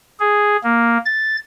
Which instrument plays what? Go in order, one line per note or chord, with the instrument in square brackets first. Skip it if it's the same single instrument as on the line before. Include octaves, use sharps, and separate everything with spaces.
[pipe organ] G#4
A#3
A6